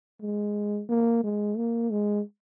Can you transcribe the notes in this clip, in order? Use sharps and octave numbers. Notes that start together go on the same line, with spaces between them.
G#3
A#3
G#3
A#3
G#3